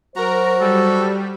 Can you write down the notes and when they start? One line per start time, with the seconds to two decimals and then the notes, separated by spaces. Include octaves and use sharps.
0.16 F#3 F#4 A#4 C5 A#5
0.61 G3 A4